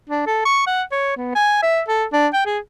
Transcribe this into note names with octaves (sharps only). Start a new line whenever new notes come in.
D4
A4
C#6
F#5
C#5
B3
G#5
E5
A4
D4
G5
G#4